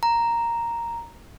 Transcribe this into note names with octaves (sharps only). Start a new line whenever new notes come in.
A#5